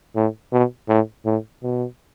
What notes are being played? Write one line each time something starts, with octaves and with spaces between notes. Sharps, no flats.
A2
B2
A2
A2
B2